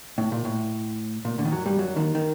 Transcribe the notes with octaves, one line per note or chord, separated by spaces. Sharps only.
A2
A#2
A2
A#2
D2 D3
D#3
F#2 F#3
G2 G3
F#2 F#3
D#2 D#3
D#3